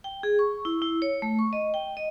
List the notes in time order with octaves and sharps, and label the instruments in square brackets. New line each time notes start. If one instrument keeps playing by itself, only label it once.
[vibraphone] G5
G#4
C#6
E4
E4
C#5
A3
C#6
D#5
G5
D#5